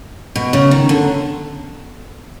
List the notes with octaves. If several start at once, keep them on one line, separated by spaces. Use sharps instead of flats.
B2
C#3
D#3
D3